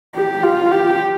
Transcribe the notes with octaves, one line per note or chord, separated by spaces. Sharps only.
G4
F4
G4